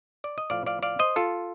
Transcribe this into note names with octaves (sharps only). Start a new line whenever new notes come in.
D5
D#5
A2 F3 D5 F5
D5 F5
D5 F5
C5 D#5
F4 A4